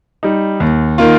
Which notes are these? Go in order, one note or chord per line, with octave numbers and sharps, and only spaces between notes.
G3 D#4
D#2
D#3 A#3 F4